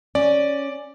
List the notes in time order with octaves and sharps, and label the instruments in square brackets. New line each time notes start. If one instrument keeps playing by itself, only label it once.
[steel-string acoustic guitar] C#4 [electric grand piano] D5